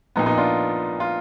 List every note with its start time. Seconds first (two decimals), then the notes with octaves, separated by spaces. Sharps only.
0.16 A#1 A#2 B3 D#4
0.26 B3 D#4
0.38 D4 F4
1.00 F4